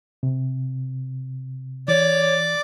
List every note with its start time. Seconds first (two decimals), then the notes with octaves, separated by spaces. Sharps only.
0.23 C3
1.88 E3 C#5 D5 D6